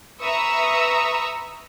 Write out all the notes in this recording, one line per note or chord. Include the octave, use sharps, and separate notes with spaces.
B4 E5 A#5 C#6 D#6 E6